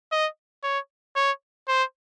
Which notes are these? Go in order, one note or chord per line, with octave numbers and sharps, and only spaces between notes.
D#5
C#5
C#5
C5